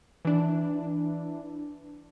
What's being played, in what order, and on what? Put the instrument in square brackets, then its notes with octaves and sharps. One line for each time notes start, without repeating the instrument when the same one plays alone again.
[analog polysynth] E3 D4